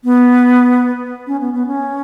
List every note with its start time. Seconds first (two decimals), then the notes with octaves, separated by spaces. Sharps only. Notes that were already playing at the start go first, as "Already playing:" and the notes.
0.04 B3
1.27 C#4
1.41 B3
1.54 B3
1.67 C#4